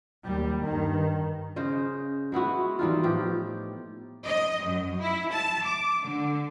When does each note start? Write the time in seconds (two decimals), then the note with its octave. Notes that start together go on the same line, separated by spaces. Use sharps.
0.24 D#2 G3
0.64 G2 D#3
1.56 C#3 C5 D#5
2.32 G#3 B3 E4 F#4
2.79 E3 G3 D#4 F4
3.03 A2 F3 G4
4.26 D#5
4.66 F#2
5.01 E4
5.32 A5
5.65 D6
6.04 D3